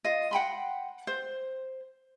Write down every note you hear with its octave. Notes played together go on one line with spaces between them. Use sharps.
F4 D#5
F#5 G5 B5 C6
C5